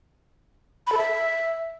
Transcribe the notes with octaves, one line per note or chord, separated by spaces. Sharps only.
B5
A4
E5